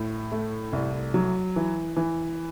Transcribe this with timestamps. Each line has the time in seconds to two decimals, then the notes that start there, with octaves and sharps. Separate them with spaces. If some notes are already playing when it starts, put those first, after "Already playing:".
Already playing: A2
0.32 A3
0.73 C2
1.14 F#3
1.56 E3
1.97 E3